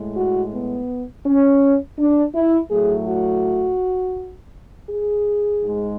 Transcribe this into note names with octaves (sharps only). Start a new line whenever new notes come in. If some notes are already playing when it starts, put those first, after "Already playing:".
Already playing: A2 G#3
F#4
B3
C#4
D4
E4
A2 F#3 A3 G#4
F#4
G#4
G#2 G#3